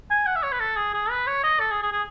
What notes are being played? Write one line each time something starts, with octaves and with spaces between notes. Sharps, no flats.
G#5
F#5
E5
C#5
B4
A4
G#4
G#4
B4
C#5
D#5
A4
G#4
G#4
G#4